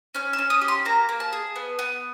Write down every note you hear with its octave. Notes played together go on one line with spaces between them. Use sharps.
C#4 F6
E6
C#4
D#6
G4
C6
A#3 A#5
A#3
A5
G#4
B3
B3